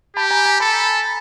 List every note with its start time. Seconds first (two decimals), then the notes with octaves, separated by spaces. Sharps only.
0.16 G4 A5 B5
0.30 G#5 A#5
0.46 G#5 A#5
0.60 A4 A5 B5